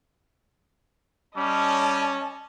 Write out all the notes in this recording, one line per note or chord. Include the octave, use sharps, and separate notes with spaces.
G3 C#4 D#5 A5